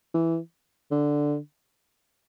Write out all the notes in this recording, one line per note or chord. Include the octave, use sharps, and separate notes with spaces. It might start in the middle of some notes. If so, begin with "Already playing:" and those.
E3
D3